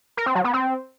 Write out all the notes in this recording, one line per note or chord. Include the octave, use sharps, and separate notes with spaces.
A#4
C4
F#3
B3
C4